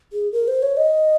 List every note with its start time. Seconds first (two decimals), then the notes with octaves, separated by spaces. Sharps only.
0.13 G#4
0.32 A#4
0.48 C5
0.63 C#5
0.77 D#5